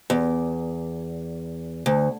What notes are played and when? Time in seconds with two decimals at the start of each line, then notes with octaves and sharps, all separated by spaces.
0.10 E2
1.86 D2